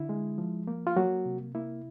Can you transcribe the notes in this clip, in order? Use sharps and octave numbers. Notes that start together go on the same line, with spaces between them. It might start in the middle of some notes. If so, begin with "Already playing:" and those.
Already playing: D3 E4
G#3
F3
A#3
F4
F#3 A#3 F#4
C3
A#3 E4